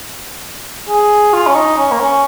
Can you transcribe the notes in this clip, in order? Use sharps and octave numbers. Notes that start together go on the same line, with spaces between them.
G#4
F4
C#4
D#4
C#4
A#3
C#4